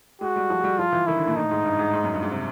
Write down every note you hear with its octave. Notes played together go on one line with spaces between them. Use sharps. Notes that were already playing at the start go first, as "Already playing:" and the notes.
G#3 F#4
G3
F3
G#3
G3
F3 F4
E3
D#3 E4
D3
A#2
A2 D#4
G#2
G2
G#2
G#2
F#2
G2
G#2
C3